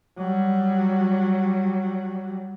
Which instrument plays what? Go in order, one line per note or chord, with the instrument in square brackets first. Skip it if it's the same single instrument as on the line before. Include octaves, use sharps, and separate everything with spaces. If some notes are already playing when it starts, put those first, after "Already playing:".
[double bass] F#3 G3